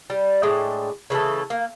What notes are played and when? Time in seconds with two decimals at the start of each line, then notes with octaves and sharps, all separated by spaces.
0.10 G3
0.43 A2 G#3 D4 G5
1.10 C#3 E3 A3 A4
1.50 A#3